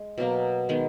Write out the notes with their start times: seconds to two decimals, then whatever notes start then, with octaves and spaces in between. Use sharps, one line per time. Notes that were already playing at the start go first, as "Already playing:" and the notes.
Already playing: G#3
0.18 B2 F#3 A#3
0.69 D#3 G#3 B3